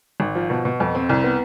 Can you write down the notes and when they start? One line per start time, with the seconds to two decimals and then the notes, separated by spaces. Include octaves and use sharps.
0.20 G#1
0.35 F3
0.50 B2
0.65 B2
0.80 F2
0.95 C4
1.09 C2
1.24 B3